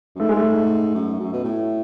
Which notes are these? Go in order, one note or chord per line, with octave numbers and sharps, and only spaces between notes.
F#2
G#2 A3
G#3
A3
F#2
F#2
B2
A2